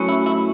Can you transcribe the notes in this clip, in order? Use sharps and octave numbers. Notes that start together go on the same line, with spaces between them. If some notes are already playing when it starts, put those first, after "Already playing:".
Already playing: A2 F#3 C#4
E4
E4